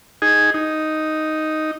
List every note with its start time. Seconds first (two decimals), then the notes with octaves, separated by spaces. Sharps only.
0.22 D#4 G#4
0.54 D#4